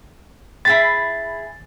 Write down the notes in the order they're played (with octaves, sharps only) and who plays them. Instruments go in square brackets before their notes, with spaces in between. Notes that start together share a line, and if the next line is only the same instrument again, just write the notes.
[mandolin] E4 G#4 B5 [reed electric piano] A6